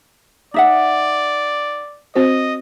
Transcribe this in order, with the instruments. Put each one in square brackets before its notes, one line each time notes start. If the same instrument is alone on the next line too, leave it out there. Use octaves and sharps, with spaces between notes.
[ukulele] D#4 E5 F#5 [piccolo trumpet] D5
[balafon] C4 F#4 C5 [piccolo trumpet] D#5